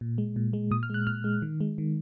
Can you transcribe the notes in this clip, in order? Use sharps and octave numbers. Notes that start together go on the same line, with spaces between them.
A#2
G#3
A#2
G#3
A#2 D#6
F6
G#3 F#6
A#2 F6
G#3
D#3
G#3
D#3